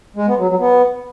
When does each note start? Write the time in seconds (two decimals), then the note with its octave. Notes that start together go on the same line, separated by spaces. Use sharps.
0.16 G#3
0.27 B3
0.38 F#3
0.49 F#3
0.59 B3